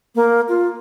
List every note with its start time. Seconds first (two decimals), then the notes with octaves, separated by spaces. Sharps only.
0.15 A#3
0.48 F4